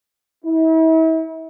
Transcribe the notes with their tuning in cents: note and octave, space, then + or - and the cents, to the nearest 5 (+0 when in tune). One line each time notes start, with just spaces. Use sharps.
E4 -40